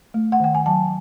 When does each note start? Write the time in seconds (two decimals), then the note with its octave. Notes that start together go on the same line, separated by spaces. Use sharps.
0.14 A3
0.32 F#5
0.40 D#3 G5
0.55 G#5
0.66 F#3 A5